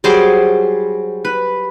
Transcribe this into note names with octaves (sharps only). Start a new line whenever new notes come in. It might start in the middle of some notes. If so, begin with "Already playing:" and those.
F#3 G3 G#4 C5
B4